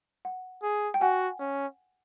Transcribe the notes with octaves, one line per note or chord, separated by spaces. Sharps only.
F#5
G#4
G5
F#4 F#5 G#5
C#4